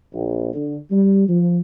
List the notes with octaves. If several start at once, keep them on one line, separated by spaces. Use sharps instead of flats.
A#1
D3
G3
F3